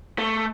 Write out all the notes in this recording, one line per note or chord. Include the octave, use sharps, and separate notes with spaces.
A3